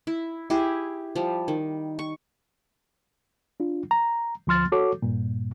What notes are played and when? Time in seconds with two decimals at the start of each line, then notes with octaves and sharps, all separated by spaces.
0.07 E4
0.50 E4 G4 G#4
1.16 F3 G3
1.48 D#3
1.99 C#6
3.60 D4 F4
3.91 A#5
4.47 D2 F3 C6 F6 A6
4.72 F#4 A4 C#5 D6
5.02 G2 A#2